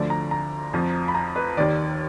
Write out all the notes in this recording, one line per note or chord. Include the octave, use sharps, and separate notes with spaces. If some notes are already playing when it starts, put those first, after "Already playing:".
Already playing: D2 D3 F3 D5
A#5
A#5
F2 F3
B5
A#5
B4
D#2 D#3 D5